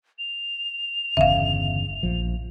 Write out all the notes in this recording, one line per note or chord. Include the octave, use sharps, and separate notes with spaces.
F7
G1 E2 C#3 E5 F5
A#1 F3